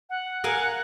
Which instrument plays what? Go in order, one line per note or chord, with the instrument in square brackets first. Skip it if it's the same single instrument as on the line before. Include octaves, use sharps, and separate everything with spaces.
[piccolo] F#5
[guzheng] A#4 F5 G#5